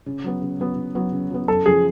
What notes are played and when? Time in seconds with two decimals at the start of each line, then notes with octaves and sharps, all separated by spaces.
0.06 C#3
0.24 F#3 B3
0.42 C#3
0.60 F#3 B3
0.77 C#3
0.95 F#3 B3
1.12 C#3
1.30 F#3 B3
1.48 F#2 A4
1.66 C#3 F3 G#4